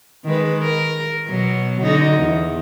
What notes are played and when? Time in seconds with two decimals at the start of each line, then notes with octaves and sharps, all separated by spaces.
0.25 D#3 G#3 B4
0.62 A#4
1.28 B2 F#3
1.80 D3 D#4 F#4
2.17 E2